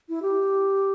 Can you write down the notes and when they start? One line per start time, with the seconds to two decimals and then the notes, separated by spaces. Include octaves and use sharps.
0.09 E4
0.22 G4